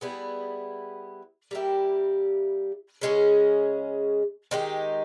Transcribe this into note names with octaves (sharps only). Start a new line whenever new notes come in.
G3 B3 E4 G#4
G3 A#3 E4 G4
C#3 G#3 C#4 G#4
D#3 G#3 D#4 G4